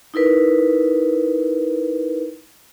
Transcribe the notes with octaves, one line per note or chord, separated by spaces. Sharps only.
D#4 E4 A#4 B4